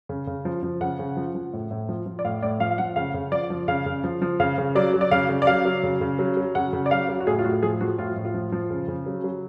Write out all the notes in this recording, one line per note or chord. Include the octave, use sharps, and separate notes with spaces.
C#3
C#3
F3
F3
C#3 F#5
C#3
F3
F3
A2
A2
F3
F3
D5
A2 F5
A2 D5
F3 F5
F5
F3 F#5
C#3 F5
C#3
F3 D5
F3
C#3 F5
C#3
F3
F3
C#3 F5
C#3
F#3 D5
F#3
D5
C#3 F5
C#3
D5
F#3 F5
F#3
C#3
C#3
F#3
F#3
C#3 F#5
C#3
D5
F#3 F5
F#3
F#4
A2 G#4
F4
A2 F#4
F3 G#4
F3 F#4
A2 F4
A2
F4
F3
F3
C#3
C#3
F#3
F#3